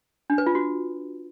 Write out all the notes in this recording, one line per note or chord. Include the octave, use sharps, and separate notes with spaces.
D4
B4
F4
F#4